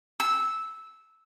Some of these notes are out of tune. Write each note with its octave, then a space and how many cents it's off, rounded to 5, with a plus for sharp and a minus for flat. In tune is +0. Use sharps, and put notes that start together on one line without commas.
E6 -10